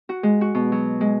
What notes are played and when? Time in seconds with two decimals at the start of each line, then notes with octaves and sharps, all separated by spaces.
0.09 F#4
0.23 G#3
0.41 F#4
0.55 B2
0.72 F#3
1.01 G#3